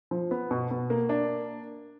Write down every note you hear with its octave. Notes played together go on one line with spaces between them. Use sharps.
F3
B3
B2
B2
A#3
D4